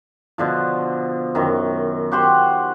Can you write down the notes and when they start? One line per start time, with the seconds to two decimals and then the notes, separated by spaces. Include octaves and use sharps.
0.38 B2 D3 F3
1.35 F#2 D#3
2.12 F#4 G4 C5 F#5